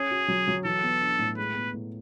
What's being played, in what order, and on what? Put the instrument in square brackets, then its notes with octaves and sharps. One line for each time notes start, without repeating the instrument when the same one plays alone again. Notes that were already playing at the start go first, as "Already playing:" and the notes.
Already playing: [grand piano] C#4 [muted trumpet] G#4
[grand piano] F#4
F#3
F#3
[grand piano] E3 [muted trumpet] A4
[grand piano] B3
D4
A2
[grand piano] G#3 [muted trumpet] B4
[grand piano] B3
A2